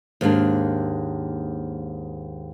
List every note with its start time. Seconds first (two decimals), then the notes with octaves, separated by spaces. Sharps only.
0.21 D#2 G#2 A#3 D4